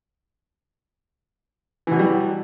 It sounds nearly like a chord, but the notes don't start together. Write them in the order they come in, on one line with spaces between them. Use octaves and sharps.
E3 B2 F#3 G3